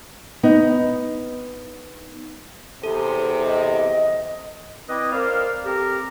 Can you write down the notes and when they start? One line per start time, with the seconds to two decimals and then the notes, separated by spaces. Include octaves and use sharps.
0.43 B3 D#4
2.83 E2 C3 A4
3.45 D#5
4.88 C4 E4 B4 D5 D#5
5.13 A#4 C5 D5 F5
5.64 C4 G4 A4 A#4